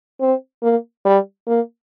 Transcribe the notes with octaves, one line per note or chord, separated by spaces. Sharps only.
C4
A#3
G3
A#3